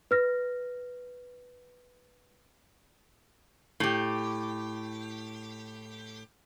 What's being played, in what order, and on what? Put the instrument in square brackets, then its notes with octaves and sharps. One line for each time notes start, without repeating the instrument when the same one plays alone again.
[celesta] B4 F6 A#6
[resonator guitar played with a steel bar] A2 G4